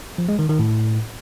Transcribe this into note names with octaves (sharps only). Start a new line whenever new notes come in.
F3
G#3
D#3
D#3
A2